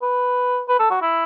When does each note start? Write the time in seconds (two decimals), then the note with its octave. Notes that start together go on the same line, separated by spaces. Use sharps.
0.02 B4
0.69 B4
0.79 A4
0.91 F#4
1.02 E4